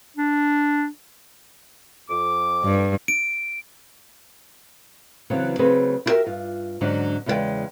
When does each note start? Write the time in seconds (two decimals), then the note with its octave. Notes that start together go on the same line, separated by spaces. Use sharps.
0.17 D4
2.10 F2 D6
2.64 G2
3.08 D7
5.30 C#3 E3 F#3 B3 C4
5.59 C#3 F#3 A3 C4 G#4 B4
6.06 E4 F#4 G4 A4 A#4 E5
6.26 G2 F4
6.81 G#2 D3 F#3 C#4 D4
7.26 E2 C#3 G#3 A#4 D5 G5